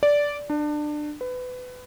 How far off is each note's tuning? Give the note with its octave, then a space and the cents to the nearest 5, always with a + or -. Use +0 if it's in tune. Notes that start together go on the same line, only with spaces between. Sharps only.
D5 -10
D4 +25
B4 +25